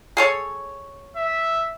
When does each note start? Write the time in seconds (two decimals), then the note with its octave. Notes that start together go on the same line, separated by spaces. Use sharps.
0.17 G#4 A4 C#5
1.17 E5